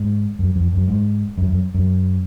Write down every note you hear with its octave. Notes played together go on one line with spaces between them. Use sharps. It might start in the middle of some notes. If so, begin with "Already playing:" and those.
Already playing: G#2
F#2
F2
F#2
G#2
F#2
F#2
F#2